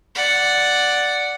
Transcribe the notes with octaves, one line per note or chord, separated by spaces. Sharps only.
D5 F#5